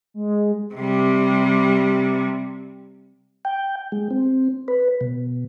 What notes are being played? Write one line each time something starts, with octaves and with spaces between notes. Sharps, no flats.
G#3
C3 G3
G5
G#3
C4
B4
B2